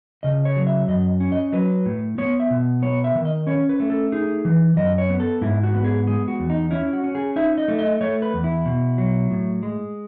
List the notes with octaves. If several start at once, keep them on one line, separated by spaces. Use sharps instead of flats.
C#3 D#5
C#5
F#3
E5
F#2 D#5
C#4
D#5
F#3 B4
A2
B3 C#5
E5
B2
B3 C#5
E5
D#3
D#5
C#4 C#5
B4
A3
A4
D#4 G#4
E3
F#2 D#5
C#5
B3
A4
G#2 E4
F#4
B3
G#4
G#3 G#4
F#4
E2
D#4
C#4 E4
F#4
C#4
G#4
D#4 E5
D#5
A3
D#5
A3 C#5
B4
E2
E4
B2
F#3
A2
G#3